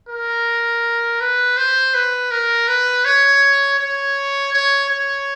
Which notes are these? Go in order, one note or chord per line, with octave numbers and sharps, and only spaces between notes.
A#4
B4
C5
B4
A#4
B4
C#5
C#5
C#5
C#5